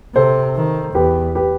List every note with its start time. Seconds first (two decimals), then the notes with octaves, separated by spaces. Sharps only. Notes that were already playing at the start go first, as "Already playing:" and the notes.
0.15 C3 A4 C5
0.56 D#3
0.95 E2 G4 B4
1.35 G4 B4